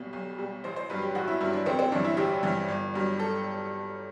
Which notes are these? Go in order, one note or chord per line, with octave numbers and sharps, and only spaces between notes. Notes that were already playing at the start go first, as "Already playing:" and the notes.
Already playing: B1 B2 G3
B1
B2 G3
A1 C5
C5
G2 F#3 B4
G4
A1 F#4
E4
G2 F#3 E4
D4
A1 C4
C4
G2 E3 D4
E4
A1 G4
G2 E3
G1
G2 F#3
A4